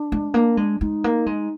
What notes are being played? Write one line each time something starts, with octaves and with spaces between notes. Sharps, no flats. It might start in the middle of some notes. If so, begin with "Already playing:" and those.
Already playing: D4
G#3
A#3
G#3
G#3 D#4
A#3
G#3